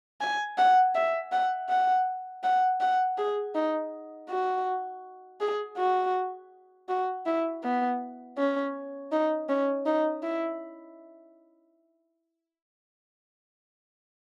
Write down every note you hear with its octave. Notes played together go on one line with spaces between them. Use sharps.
G#5
F#5
E5
F#5
F#5
F#5
F#5
G#4
D#4
F#4
G#4
F#4
F#4
E4
B3
C#4
D#4
C#4
D#4
E4